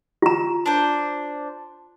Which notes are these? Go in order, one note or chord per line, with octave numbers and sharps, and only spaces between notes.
F4 A#5
D4 C5